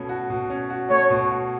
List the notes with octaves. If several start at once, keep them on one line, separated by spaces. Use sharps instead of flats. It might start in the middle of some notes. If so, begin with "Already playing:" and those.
Already playing: B2 A3 C#4
F#4
B2
C#4
F#4
A3 C#5
B2
F#4